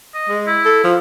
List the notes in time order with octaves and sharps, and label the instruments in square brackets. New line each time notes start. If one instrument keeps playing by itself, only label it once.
[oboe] D#5
[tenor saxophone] G#3
[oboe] E4
[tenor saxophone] A4
F3